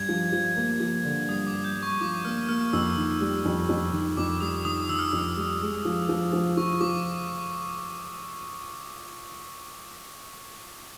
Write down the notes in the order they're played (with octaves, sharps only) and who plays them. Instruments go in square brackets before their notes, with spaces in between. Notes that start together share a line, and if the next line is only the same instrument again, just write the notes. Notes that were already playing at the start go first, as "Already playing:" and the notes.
Already playing: [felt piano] G2 [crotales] G#6
[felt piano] F3
F3
A#3
F3
D3
[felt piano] G2 [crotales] D#6
[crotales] D6
[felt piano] G2
[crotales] G6
[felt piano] G2
[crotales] C#6
[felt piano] F3 [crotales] D6
[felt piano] A#3 [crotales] F6
[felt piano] A#3 [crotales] F6
[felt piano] F2 [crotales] E6
[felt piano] D#3
G3
F2
F2
D#3
[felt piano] F2 [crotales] D6
[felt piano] G3 [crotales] D#6
[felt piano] D#3 [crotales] D#6
[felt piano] D#3 [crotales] E6
[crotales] F6
[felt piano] F2 [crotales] E6
[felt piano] G3
G#3
F3
F3
F3
[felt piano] F3 [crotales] C#6
[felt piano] F3 [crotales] D6